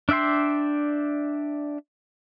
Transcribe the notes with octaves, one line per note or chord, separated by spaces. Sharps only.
D4 D5 E5 G5 C6